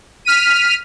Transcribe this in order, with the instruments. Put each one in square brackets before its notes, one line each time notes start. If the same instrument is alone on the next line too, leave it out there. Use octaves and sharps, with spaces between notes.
[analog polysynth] F6 B6 D#7